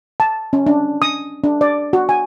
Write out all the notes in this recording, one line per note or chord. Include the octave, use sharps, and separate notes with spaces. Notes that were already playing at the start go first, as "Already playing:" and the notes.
A5
C#4
D4
D#6
D4
D5
F#4
G#5